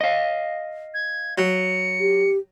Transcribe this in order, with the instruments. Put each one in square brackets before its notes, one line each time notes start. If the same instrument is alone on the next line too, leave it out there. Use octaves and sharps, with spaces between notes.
[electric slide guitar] D#5 F5
[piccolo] G#6
[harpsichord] F#3 [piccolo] C#7
[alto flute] G4